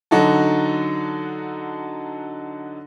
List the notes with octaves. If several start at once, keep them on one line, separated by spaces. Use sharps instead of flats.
D3 F#3 D#4 F#4 A4